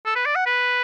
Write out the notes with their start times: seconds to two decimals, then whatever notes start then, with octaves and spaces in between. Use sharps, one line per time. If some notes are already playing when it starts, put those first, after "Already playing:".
0.06 A4
0.16 B4
0.26 D5
0.35 F#5
0.46 B4